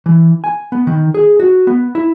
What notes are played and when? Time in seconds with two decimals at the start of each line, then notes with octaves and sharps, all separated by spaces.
0.06 E3
0.44 G#5
0.72 B3
0.87 D#3
1.14 G#4
1.40 F#4
1.67 B3
1.95 E4